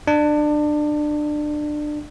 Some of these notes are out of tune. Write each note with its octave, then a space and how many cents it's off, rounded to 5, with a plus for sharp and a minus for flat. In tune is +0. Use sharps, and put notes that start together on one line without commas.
D4 +25